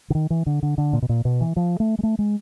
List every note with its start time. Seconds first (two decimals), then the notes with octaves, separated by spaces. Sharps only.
0.10 D3
0.15 D#3
0.30 E3
0.46 D3
0.63 D3
0.78 D3
0.93 A#2
1.02 B2
1.09 A#2
1.25 B2
1.41 E3
1.56 F3
1.80 A3
1.99 G#3
2.03 A3
2.19 G#3